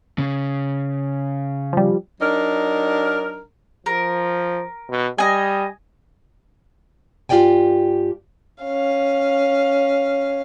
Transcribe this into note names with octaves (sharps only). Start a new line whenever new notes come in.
C#3
F3 G3
F#3 D4 D#4 A#4
F3 A#4
B2
G3 D#5 G#5
G2 F4 G4 D5 G5 G#5
C#4 F5